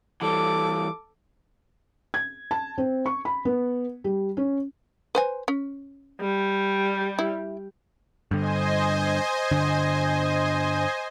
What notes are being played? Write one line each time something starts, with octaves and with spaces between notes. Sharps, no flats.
E3 G3 A4 D6
G#6
A5
C4
C#6
B5
B3
G3
C#4
B4 C5 G#5
C#4
G3
E4
G2 D3 C5 D#5 G#5
G2 D3 D4